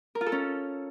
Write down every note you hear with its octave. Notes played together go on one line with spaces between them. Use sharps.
A#4
F4
A4
C#4